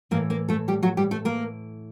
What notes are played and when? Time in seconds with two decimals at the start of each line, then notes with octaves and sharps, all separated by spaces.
0.11 A2 E3 A#3 A#4
0.30 A#3 A#4
0.49 A3 A4
0.68 G3 G4
0.83 F#3 F#4
0.97 G3 G4
1.11 A3 A4
1.25 A#3 A#4